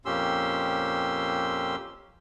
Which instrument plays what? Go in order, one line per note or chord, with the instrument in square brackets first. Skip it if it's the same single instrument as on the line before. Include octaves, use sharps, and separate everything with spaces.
[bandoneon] F2 A#2 C#4 G4 C6 E6